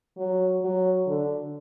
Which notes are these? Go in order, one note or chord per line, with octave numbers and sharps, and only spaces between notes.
F#3
F#3
D3